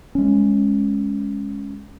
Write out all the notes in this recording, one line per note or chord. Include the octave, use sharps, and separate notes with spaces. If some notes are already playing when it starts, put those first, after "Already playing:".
G#3 C#4